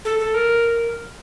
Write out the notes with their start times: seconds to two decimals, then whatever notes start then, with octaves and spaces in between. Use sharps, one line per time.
0.05 A4
0.20 A4
0.34 A#4